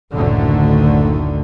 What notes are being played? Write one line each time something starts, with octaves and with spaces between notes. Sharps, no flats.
F#1 D2 A2 D3 D#3 A3